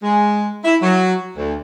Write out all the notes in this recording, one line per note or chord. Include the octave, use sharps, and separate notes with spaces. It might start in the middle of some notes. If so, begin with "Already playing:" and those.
G#3
E4
F#3
D2